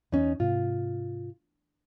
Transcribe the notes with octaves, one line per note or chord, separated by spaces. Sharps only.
E2 C#4 D#4
G#2 C3 F4